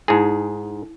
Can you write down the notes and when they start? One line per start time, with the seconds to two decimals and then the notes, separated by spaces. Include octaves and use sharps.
0.08 G#2 D#4 E4 G#4